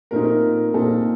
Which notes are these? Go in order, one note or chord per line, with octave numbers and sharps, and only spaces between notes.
A#2 A3 C4 D#4 A#4
A#2 A3 C4 D#4 A4